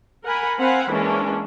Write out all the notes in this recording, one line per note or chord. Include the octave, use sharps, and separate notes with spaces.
A#4 F#5 G#5 B5
C4 C5 F5 F#5 G#5 B5
E3 G#3 A#3 C#4 D4